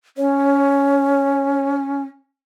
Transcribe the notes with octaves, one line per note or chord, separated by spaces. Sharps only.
C#4 C#5